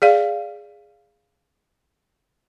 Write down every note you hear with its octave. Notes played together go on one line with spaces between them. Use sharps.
G#4 D5 F5